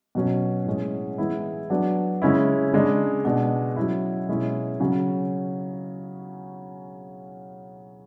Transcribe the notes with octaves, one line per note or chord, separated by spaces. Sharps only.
B2 F#3 C#4
A2 G#3 C#4
E3 G#3 B3 E4
F#3 B3 D4
C#3 G#3 C#4 E4
C#3 G#3 D4
B2 G#3 D4
F#3 C#4 E4
B2 G#3 C#4 E4
C#3 F#3 C#4